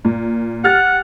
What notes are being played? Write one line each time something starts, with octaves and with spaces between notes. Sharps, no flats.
A#2
G4 F#5 F6 A6